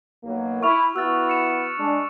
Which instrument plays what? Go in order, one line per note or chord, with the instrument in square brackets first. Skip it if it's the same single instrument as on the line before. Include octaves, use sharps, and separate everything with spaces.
[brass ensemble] B1 F#3 A#3
[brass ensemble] E4 [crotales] C#6 F6 F7
[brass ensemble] B3 E4 F#4 [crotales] E6 F#6 A6
[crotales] E6 C#7 E7
[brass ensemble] G#3 D4